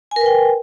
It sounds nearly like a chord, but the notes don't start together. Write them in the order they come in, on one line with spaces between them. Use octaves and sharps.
G#5 A#4 B4 G5